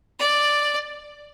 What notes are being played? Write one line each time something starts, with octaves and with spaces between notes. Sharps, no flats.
D5